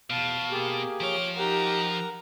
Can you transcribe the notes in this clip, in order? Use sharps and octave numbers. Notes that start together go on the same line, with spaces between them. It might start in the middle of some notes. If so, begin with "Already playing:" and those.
E2 B2 F5 A5
A#3 G4 G#4
F3 C#5 F5 D7
D#4 G4 A#4 F#5 A#5